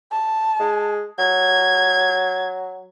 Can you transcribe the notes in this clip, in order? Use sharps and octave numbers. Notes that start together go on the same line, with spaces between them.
A5
G#3
F#3 G#6